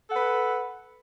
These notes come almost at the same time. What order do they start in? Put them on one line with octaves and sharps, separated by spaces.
A4 F#5 B4